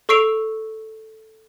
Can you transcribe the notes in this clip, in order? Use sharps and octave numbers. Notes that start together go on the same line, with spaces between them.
A4 C#6 E6 C7 D7 F7